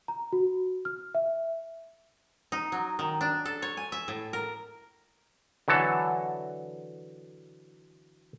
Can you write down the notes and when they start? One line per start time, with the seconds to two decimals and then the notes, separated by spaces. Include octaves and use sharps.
0.08 A#5
0.33 F#4
0.85 F6
1.15 E5
2.52 D#4
2.72 F#3
2.99 D#3
3.21 D4
3.45 A4
3.62 C#5
3.77 G#5
3.92 E5
4.08 A2
4.33 A#4
5.68 D3 E3 F#3 A4